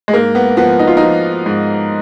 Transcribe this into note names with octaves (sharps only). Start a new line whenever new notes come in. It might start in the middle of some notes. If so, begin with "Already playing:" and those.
G#3
G#2 A#3
B3
F3 B3
D#4
F4
D#4
F3
G#2